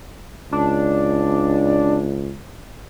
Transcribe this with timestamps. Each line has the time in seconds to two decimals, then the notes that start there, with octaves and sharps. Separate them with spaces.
0.52 C#2 D4